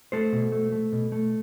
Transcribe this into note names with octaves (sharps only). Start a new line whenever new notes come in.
A3 A4 C5
B2
A3
A3
B2
A3